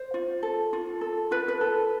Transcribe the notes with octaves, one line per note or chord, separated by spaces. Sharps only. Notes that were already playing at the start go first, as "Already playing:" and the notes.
Already playing: C5
F4
A4
F4
A4
F4 B4
B4
A4